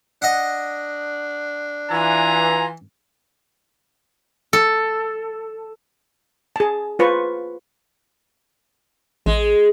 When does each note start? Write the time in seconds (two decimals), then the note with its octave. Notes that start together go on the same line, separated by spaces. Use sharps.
0.22 D4 D#5 F#5
1.90 E3 F4 G#5 A#5
4.53 A4
6.56 G#4 A5
6.99 F4 B4 C5 C#6
9.26 A1 G#3